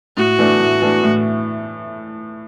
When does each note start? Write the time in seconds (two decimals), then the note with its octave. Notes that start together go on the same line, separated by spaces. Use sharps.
0.17 A2 F#4
0.39 E3 A3 D4
0.60 A2
0.82 E3 A3 D4
1.04 A2